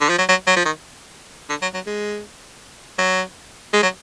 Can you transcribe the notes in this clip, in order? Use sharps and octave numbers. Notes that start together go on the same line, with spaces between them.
D3
F3
F#3
F#3
F#3
F3
D#3
D3
F#3
F#3
G#3
F#3
G#3
F#3